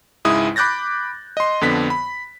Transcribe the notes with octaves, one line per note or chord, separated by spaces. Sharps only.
C#2 G#2 G#3 E4 D#6
B5 D6 F#6 G6 A6 A#6
D#5 C6
F2 D3 B3 B6
B5